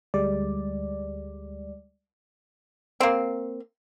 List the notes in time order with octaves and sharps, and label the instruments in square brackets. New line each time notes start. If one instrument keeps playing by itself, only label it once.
[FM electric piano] D2 G3 G#3 D5
[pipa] A#3 C4